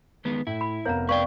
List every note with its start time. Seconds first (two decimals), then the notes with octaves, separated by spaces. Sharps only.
0.25 D#3 G#3 B3
0.47 A2 E4
0.61 B5
0.85 F1 B3 A#4 C#5 F5 A#5
1.09 B4 D5 F5 G5 C#6